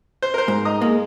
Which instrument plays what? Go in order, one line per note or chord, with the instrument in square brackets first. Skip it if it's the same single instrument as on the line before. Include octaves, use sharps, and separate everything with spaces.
[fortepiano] C5
A#4 C5
[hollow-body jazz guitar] G#2
[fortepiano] D#5 A#5 D#6
[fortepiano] G#3 [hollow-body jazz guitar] A#3